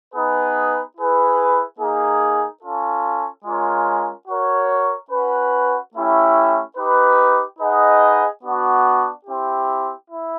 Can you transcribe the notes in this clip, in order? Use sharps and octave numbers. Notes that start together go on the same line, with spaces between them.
B3 D#4 G#4 B4
E4 G#4 B4
A#3 D#4 G#4
C#4 F4 A4
G#3 C#4 F4 A#4 C#5
F#4 A#4 C#5
C#4 F#4 B4
A3 C#4 E4 G4
D#4 G4 B4
D#4 G#4 B4 D#5 F#5
B3 D4 F#4
C4 E4 G4
E4